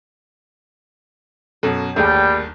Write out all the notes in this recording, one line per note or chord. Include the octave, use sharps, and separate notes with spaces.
F#2 B2 A4
G1 D#2 G3 A3 A#3 G#4 G5